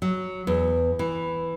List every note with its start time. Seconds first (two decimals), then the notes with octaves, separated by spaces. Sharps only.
0.02 F#3
0.47 E2
0.99 E3